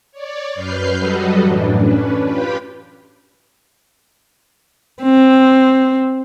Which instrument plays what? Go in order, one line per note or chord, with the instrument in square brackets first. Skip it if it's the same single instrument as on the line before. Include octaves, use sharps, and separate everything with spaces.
[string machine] C#5 D5
F#2 B4 F6 G6 C7
F#3 G3 F#4 A4 B4 D#5
F#2 A2 E3 D4
C#4 D4 B4
F4 G4 B4 G5 B5
[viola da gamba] C4